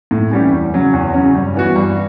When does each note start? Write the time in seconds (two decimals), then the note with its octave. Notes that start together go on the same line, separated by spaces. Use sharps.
0.11 A2
0.31 E3 G3 C#4 G4
0.52 E2
0.73 C#3 F#3 C#4
0.93 E2
1.13 C#3 F#3 C#4
1.35 G2
1.55 E3 B3 F#4
1.76 G2